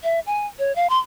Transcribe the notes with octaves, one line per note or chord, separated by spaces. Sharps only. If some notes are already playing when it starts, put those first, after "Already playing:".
E5
G#5
C#5
F5
C6